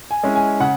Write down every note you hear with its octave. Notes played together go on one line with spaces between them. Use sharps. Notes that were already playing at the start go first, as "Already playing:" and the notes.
G#5
G#3 C#4 E4
G#5
C#3 F#5